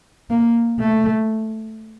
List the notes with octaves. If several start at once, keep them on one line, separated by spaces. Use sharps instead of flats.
A#3
A3